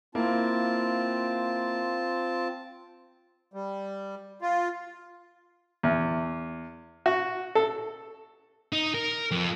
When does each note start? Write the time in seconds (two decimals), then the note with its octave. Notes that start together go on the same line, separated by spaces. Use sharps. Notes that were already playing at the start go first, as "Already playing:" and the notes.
0.15 A#3 C4 E4 F4 A5
3.54 G3
4.42 F4
5.83 E2
7.06 F#4
7.55 A4
8.73 D#4
8.94 A#4
9.31 F2